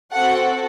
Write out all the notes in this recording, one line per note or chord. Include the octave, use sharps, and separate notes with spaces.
C4 F#4 A4 F#5